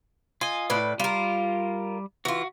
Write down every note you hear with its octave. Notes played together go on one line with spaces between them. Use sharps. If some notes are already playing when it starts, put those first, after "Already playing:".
F4 D#5 G#5
A2 B4 D5
G3 F4 A#4
E3 F4 F#4